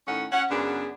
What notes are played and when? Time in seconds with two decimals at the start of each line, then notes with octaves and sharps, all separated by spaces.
0.08 A2 D#3 A3 C#4 F#5
0.32 C#4 F#5
0.50 F#2 C#3 B3 D4 G#4 B4